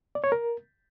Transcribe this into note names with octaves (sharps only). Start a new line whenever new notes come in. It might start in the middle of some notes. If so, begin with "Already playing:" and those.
D5
C#5
A#4